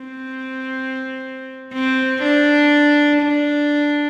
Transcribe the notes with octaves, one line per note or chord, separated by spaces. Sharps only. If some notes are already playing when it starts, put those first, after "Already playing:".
Already playing: C4
C4
D4
D4